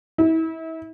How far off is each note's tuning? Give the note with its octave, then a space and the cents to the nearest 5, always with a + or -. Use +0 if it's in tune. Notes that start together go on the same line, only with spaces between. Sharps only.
E4 -35